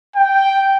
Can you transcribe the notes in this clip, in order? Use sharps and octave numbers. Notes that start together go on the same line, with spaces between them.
G5